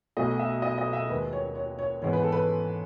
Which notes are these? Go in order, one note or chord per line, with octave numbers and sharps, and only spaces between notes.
B1 B2 A3 D#5
E5
D#5
D#5
E5
D#2 D#3 G#3 B4
C#5
C#5
C#5
G#2 E3 G#3 B3 C#5
B4
A4
B4